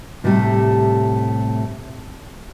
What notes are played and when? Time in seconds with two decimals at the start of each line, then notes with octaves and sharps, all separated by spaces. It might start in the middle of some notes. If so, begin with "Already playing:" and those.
0.24 A2 C3 G3 A3